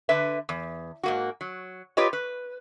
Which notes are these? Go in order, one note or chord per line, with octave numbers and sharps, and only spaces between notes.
D3 B4 E5
E2
G#2 A#3 F#4
F#3
F4 G4 B4 C#5 D#5
B4